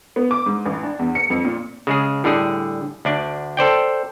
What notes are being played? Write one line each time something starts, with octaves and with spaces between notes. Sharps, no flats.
B3
D6
G#2
A1
D4
E2
C#7
F2
A#2
C#3 G#3 G#4
A2 D3 G3 G#4
D2 D4 D5
A4 C5 D5 G5